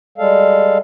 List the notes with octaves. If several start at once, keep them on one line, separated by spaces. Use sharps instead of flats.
G3 G#3 A4 F5